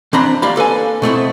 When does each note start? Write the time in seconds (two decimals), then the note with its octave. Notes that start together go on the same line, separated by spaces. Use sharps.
0.13 E3 C4 D4 A#5 B5
0.42 G3 A#3 F5 B5
0.56 A#3 A4 B4 G#5
1.02 B2 A3 C4 E4